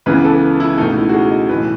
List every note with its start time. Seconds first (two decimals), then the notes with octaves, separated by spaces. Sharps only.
0.06 C#2 C#3 E3 B3 B4
0.24 A4
0.60 E4
0.78 C#2 B2 A3 D#4
0.96 E4
1.09 F#4
1.13 G#4
1.31 D#5
1.49 B1 A2 E3 B4